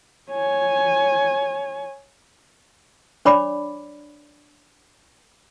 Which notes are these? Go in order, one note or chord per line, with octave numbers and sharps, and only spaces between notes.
C#5 G#5
D4 C#5 D5 B5 D6